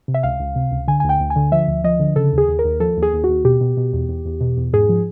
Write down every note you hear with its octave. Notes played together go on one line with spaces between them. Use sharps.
C3
E5
C#2 F5
C#2
C3
C#2
D3 G#5
D2 G#5
G5
D2
G#5
D3
F3 E5
D2
F3 D#5
D3
C#3 A4
D#2
G#4
D#2
A#4
D#2
F3 A4
D#2
G#4
D#2
D#2 F#4
B2 G4
B2
B2
E2
E2
E2
B2
E2
G#2 G#4
F3